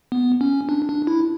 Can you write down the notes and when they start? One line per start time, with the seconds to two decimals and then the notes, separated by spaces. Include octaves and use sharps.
0.12 B3
0.41 C#4
0.69 D4
0.89 D4
1.07 E4